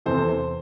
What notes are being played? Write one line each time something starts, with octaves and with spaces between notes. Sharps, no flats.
E2 C3 E3 A4 C5